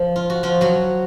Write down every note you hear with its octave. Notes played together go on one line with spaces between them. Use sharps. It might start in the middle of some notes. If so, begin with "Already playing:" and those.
Already playing: F3
F4
F#4
F3 F4
F#3 F#4